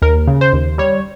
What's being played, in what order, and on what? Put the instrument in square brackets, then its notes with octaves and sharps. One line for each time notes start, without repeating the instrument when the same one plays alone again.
[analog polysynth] D#2 A#4
C#3
C5
D#2
G3 C#5